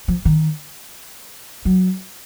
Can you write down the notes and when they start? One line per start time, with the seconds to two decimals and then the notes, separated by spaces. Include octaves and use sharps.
0.08 F3
0.25 D#3
1.65 F#3